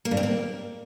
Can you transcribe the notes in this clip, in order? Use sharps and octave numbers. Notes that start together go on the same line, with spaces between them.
A#3
G2
C4
A#3